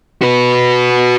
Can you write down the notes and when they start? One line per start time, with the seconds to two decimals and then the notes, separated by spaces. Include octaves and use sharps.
0.22 F#4 B4